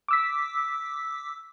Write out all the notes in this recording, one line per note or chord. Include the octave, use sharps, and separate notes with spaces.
D6 E6 B6